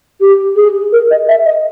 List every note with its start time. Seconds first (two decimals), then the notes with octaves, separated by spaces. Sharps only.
0.21 G4
0.56 G#4
0.92 A#4
1.11 D#5
1.28 E5
1.46 D#5